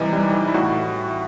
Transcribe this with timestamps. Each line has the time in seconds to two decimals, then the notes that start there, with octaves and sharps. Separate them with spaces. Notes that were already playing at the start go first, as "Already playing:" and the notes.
Already playing: C3 E3 G3 D#4
0.13 G3
0.34 E3
0.47 E4
0.54 A2 F#4